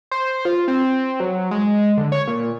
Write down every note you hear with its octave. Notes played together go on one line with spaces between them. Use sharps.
C5
F4
C4
F#3
G#3
D3
C#5
A#2